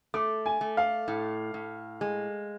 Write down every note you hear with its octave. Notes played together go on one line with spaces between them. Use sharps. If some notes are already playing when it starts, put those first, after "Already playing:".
A3 D6
G#5
A3
F5
A2
A2
G#3